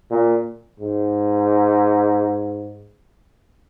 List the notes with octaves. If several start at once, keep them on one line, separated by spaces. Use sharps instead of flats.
A#2
G#2